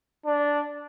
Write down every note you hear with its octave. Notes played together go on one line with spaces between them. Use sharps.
D4